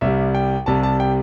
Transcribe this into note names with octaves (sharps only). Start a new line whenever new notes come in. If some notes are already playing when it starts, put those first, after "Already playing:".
C2 C3 G3 E5
G5
C2 C3 G3 A5
A5
G5